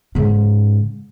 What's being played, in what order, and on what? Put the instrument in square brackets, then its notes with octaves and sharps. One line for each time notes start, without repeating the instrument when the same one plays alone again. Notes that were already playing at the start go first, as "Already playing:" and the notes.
[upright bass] G#2 C#3